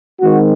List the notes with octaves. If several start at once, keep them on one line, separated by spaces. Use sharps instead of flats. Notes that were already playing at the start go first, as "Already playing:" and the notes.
D#3 G#3 C4 F#4